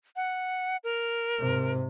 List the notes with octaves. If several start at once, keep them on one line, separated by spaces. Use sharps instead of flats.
F#5
A#4
G#2 C3